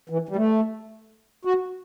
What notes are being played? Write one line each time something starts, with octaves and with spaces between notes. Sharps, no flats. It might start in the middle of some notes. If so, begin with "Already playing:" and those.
E3
G3
A3
F#4